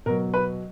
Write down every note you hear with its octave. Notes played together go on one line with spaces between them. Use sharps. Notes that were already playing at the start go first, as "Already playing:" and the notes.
B2 F#3 A#4
B4